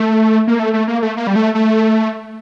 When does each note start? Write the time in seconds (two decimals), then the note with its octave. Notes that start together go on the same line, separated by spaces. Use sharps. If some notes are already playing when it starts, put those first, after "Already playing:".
Already playing: A3
0.47 A#3
0.59 A3
0.73 A3
0.88 A#3
1.03 A3
1.17 A#3
1.27 G3
1.36 A3
1.55 A3